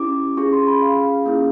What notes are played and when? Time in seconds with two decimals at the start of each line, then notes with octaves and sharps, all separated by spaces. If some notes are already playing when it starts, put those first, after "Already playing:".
Already playing: C#4 E4 G4 D6
0.37 C#4 F4 G#4 C#6
0.53 C6
0.67 B5
0.82 F5
1.26 A#3 C#4 E4 G#4